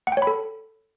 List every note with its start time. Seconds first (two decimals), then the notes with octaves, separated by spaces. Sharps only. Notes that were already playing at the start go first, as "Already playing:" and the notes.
0.07 F#5
0.12 G5
0.17 C#5
0.22 B5
0.27 A4